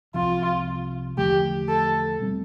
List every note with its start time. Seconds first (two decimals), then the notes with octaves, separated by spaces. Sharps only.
0.14 C2 C3 F3 F4
1.17 E2 D3 F3 A3 G4
1.69 A4
2.20 B2 G3 C4